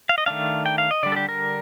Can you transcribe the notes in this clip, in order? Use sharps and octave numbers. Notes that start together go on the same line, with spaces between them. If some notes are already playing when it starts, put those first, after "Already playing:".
F5
D#5
D#3 A3 D4 F5
G5
F5
D#5
D3 G3 D4 D5
A4
G4
A#4